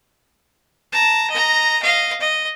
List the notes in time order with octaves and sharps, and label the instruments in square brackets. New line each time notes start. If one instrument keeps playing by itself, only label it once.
[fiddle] A5 A#5
D#5 A#5
D#5 F5
D#5